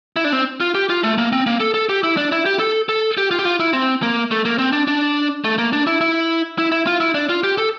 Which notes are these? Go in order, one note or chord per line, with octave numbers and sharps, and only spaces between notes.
E4
D4
C4
F4
G4
F4
A3
A#3
C4
A#3
A4
A4
G4
E4
D4
E4
G4
A4
A4
G4
F4
G4
F4
E4
C4
A#3
A3
A#3
C4
D4
D4
A3
A#3
D4
E4
E4
E4
E4
F4
E4
D4
F4
G4
A4